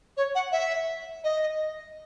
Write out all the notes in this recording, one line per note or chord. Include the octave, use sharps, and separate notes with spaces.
C#5
F#5
E5
D#5